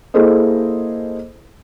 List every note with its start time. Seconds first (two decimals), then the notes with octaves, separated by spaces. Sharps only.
0.14 A#3 E4 G#4 A4 C5 D#5